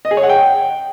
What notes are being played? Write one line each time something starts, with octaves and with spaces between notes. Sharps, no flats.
D#5
G#4
C#5
F#5
G5